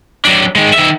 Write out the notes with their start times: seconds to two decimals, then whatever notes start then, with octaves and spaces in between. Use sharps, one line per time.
0.25 F#3 D4
0.56 D#3 G#3
0.73 D#3 E5